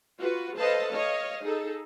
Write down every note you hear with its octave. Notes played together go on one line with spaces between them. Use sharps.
F4 F#4 B4
A4 B4 C5 D#5 F5 A5
C#5 D#5 F5
D#4 G#4 A4